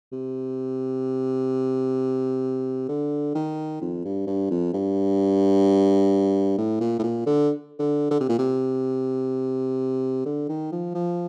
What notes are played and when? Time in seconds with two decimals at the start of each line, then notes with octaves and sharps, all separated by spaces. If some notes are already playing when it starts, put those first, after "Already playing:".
0.12 C3
2.89 D3
3.35 D#3
3.81 F2
4.05 G2
4.27 G2
4.51 F2
4.73 G2
6.58 A2
6.80 A#2
6.99 A2
7.03 A#2
7.26 D3
7.79 D3
8.11 D3
8.20 C3
8.29 A#2
8.39 C3
10.26 D3
10.49 D#3
10.72 F3
10.95 F3